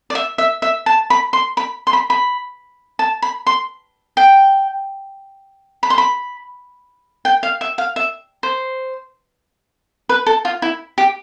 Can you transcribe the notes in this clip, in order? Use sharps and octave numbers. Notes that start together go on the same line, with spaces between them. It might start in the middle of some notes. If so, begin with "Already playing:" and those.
D5
E5
E5
E5
A5
B5
C6
B5
C6
B5
B5
A5
B5
C6
G5
B5
C6
B5
G5
F5
E5
F5
E5
C5
B4
A4
F4
E4
G4